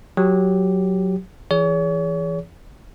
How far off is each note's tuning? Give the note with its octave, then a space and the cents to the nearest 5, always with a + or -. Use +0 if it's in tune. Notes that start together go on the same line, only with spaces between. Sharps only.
F#3 -5 G4 +0
E3 +25 G#4 +0 C#5 +40